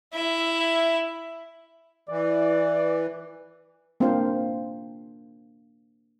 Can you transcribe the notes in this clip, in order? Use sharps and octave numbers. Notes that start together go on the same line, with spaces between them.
E4 E5
E3 D5
A#3 C4 D4 F4 C5 F5